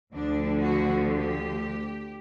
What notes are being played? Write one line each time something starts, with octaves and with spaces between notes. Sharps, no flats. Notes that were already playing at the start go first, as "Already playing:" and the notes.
D2 D3 F3 D4
F#4
G4